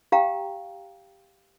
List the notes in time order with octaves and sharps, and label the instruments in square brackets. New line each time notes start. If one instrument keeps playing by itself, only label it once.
[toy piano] G4 F5 G5 A#5